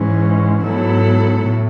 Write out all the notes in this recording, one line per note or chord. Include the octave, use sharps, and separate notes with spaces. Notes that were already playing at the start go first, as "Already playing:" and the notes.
Already playing: G#2 E3 G#3 C#4
G#2 F#3 B3 E4 A4
A2